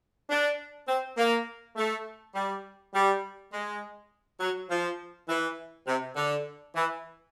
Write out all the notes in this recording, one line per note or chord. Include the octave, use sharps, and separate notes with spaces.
D4
C4
A#3
A3
G3
G3
G#3
F#3
F3
E3
C3
D3
E3